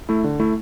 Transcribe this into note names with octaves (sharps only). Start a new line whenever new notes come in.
A3 E4
D3
A3 E4